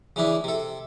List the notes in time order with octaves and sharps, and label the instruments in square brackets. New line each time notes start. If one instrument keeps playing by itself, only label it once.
[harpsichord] C#3 E3 D4 E4
C3 A4